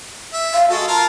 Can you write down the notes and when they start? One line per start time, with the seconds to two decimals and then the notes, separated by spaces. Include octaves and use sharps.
0.33 E5
0.53 F5
0.69 G#3 F#4 A4
0.88 F4 A#4 A5